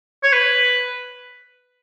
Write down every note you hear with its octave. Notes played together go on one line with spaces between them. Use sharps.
C#5
B4